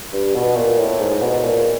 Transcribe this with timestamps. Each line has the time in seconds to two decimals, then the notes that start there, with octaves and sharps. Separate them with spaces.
0.13 G2
0.35 B2
0.56 A#2
0.79 A2
1.00 G#2
1.22 B2
1.44 A#2